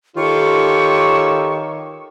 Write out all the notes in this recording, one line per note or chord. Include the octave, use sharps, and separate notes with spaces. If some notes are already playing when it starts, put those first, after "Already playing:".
D#3 F4 G4 A4 C#5 C#6